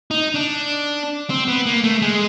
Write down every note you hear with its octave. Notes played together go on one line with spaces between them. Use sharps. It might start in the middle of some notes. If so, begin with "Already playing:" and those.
D#4
D4
C4
B3
A#3
A3
G#3